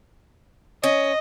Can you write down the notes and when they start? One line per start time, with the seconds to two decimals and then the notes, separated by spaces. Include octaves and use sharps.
0.84 C#4 D#5